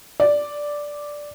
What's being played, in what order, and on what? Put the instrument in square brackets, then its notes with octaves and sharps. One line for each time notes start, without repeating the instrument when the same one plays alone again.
[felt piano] D5